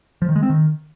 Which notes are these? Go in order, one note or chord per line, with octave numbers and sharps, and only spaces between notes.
F3
D#3
G#3
C4
D#3